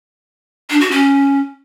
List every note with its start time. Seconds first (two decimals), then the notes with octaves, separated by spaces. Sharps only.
0.70 D4
0.81 F#4
0.91 C#4